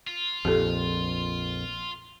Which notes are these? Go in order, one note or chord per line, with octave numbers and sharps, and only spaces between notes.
F4
A#1 F2 G4 A4